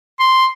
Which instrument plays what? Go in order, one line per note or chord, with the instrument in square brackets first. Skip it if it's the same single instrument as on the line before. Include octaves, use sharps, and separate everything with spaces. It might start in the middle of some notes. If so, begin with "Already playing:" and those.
[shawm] C6